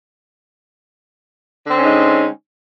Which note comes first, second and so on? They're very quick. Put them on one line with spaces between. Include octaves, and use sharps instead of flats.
D3 C4 C#4 D#4 G#3